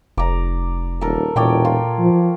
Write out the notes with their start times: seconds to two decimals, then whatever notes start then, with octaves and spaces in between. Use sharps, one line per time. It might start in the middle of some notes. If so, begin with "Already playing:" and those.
0.17 F1 D5 A#5
1.01 D#1 A4 A#4
1.36 E1 A#2 C#5 D5 G5
1.65 F4
1.99 F3